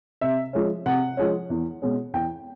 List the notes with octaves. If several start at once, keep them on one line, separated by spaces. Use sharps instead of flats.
C3 E5
F3 G#3 C#4
C3 F#5
F3 G#3 C#4
E2
B2 G#3 C#4
E2 G5